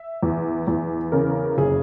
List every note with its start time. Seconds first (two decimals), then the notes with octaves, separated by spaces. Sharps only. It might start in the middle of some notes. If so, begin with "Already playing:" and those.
Already playing: E5
0.23 E2
0.68 E2
1.12 C#3 A#4
1.58 F#1 G#4